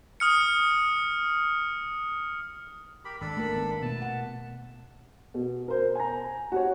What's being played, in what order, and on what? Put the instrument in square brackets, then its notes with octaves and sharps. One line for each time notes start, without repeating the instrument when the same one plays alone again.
[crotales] D#6 F6 C#7
[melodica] G4 A#4 B5
[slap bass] G#1 [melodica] D4 A4 B5
[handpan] A3 A#3 A#4
B3
[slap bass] B2 A3 [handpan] B3 [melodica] A5
[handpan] F#5
[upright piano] B2
A#4 C5
G#5 A#5
F#4 G4 C#5